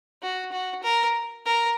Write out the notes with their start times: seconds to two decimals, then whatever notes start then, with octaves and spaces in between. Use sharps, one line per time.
0.22 F#4
0.52 F#4
0.83 A#4
1.46 A#4